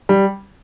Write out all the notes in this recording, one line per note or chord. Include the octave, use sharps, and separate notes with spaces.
G3